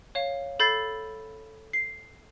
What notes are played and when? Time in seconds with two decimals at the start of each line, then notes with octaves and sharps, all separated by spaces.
0.15 C#5 F5
0.60 A4 B5 G6 A6 C7
1.73 C7